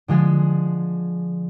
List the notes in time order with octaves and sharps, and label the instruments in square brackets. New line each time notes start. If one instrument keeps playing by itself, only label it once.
[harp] D3 F3 G#3 G#4